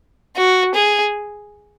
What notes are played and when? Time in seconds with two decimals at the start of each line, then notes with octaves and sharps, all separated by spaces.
0.36 F#4
0.74 G#4